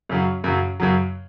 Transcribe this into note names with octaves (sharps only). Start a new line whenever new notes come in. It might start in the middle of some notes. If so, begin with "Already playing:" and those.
F#2 C#3 F#3
F#2 C#3 F#3
F#2 C#3 F#3